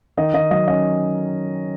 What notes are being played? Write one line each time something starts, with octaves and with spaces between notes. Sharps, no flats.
D#3 D#5
D#3 D#5
F#3 D#5
C#4 D#5